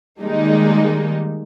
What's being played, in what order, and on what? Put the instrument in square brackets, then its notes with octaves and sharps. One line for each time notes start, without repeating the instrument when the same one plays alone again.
[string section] D#3 G3 G#3 A#3 D#4